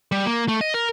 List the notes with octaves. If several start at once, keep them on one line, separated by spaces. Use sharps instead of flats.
G3
A#3
A3
D#5
A#4